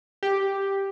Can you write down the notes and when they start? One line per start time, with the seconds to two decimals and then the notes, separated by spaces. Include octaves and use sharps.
0.23 G4